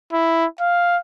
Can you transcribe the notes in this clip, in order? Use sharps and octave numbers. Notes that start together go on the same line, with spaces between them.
E4
F5